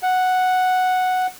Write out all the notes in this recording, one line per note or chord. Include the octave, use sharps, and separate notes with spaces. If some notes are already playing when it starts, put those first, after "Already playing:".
F#5